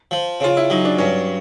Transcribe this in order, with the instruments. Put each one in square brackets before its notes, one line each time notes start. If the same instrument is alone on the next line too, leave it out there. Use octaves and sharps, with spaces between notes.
[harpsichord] F3
[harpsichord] C#3 [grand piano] F4
[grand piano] E4
[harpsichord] F#3 [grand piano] D#4
[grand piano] D4
[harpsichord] G2 [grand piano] C#4